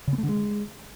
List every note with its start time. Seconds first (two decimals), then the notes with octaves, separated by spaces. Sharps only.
0.07 C#3
0.13 B3
0.18 A3
0.23 D3
0.29 G#3